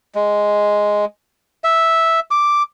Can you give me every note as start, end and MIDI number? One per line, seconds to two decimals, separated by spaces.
0.15 1.05 56
1.64 2.20 76
2.31 2.62 86